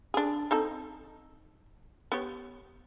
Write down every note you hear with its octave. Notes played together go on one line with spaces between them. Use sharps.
D4 G#4
C4 D#4 A4
B3 G4 C#5